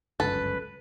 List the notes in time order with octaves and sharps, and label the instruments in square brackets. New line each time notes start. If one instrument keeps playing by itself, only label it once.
[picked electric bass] G1 C#2 F#2 [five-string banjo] A4 [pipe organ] B4